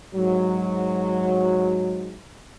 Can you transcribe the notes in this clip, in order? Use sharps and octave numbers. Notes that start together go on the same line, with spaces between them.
G#2 F#3